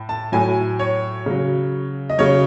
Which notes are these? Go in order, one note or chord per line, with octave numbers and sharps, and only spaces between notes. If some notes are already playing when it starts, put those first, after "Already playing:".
Already playing: A2
A5
A2 F#3 G#5
C#5
C#3 F#3
D#5
C#3 F#3 C#5